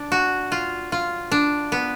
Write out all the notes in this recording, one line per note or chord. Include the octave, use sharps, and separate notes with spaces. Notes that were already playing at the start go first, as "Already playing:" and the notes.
Already playing: D4
F#4
F4
F4
D4
B3